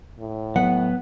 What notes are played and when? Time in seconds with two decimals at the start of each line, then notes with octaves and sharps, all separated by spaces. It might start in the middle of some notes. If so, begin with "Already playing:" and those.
0.19 A2
0.56 F#3 B3 F#5